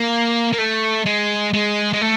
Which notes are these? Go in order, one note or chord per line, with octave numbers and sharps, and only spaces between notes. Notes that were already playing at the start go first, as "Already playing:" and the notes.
Already playing: A#3
A#3
A3
G#3
G#3
G#3
A3